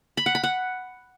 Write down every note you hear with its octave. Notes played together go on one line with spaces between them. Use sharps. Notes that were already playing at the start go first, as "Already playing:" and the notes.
B5
F#5
B5
F#5